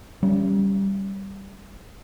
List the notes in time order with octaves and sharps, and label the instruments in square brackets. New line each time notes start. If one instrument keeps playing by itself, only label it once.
[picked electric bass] G3 C#4